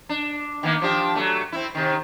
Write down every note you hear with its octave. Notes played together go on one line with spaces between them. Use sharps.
D4
D#3 A#3 B3
F3 D4 G4
F#3 A3
C4 E4
C3 D#3